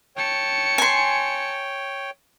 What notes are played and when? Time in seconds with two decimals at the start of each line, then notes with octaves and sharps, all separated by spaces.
0.17 C#5 G5 A5 C#7
0.78 G#5 C6